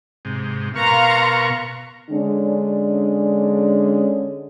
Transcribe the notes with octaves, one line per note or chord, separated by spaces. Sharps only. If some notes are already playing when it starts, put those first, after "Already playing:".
G#2 C3
B2 A#4 F5 A#5 C6 C#6
D3 G#3 C#4 D4